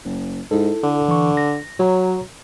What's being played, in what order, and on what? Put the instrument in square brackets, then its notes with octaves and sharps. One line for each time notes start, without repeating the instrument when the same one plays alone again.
[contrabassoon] F#1
[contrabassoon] G#2 [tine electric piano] E4 A4
[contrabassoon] D3
[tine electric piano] E3 C#6
A#6
[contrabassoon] F#3 [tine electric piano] C#5 A#5